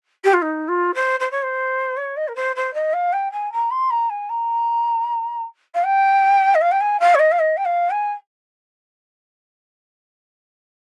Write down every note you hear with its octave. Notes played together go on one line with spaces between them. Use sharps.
G4
F4
D#4
F4
C5
C5
C#5
C5
C#5
D#5
A#4
C5
C5
D#5
F5
G5
G#5
A#5
C6
A#5
G#5
A#5
F5
G5
D#5
F5
G5
G#5
F5
C#5
D#5
F5
D#5
G5
F5
G#5